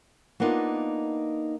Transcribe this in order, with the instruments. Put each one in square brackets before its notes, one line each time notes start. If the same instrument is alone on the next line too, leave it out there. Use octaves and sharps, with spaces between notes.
[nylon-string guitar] A#3 B3 D4 D#4 F4